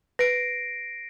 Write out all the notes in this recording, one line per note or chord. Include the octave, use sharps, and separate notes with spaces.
B4 A#6 C7 D7